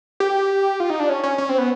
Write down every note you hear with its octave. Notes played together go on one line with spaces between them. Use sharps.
G4
F4
D#4
D4
C#4
C#4
C#4
C4
B3